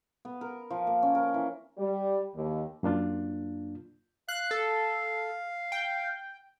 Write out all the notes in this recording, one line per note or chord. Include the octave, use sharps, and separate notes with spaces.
B3
A#4
F3
A#3
C#4
A#4
E3
G3
D#2
F#2 A#3 D4 F4
F5 F#6
A4
G5